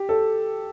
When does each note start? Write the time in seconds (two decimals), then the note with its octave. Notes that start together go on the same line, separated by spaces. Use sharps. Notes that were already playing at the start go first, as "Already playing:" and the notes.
Already playing: G4
0.09 A4